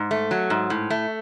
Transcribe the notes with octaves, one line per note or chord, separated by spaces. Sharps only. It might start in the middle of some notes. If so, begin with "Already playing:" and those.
Already playing: G#2
A3
F#3
G#2
A2
A3